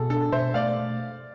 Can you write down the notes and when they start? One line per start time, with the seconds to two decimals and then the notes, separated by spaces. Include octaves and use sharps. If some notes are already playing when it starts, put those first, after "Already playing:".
Already playing: B2 G#4 A4
0.10 D4 A4
0.32 B2 C5 E5
0.54 A3 D5 F5